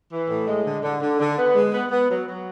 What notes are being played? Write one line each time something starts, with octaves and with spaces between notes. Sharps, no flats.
E3
A2
G#3
D3
D3
D3
D3
B3
G#3
B3
B3
F#3
F#3